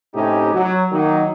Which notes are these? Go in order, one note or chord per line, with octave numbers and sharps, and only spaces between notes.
A2 C3 C#4 D#4 G4
F#3
D#3 F#3 A#3 D#4